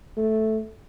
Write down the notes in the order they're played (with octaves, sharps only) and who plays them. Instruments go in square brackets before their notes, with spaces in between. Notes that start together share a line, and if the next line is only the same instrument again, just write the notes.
[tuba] A3